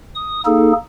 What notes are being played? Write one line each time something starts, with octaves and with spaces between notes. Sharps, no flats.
D#6
A#3 D#4 G#4 A4